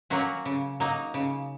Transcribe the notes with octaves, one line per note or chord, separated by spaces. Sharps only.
F#3 A#3 C#4 F#4
C#3
F#3 A#3 D#4
C#3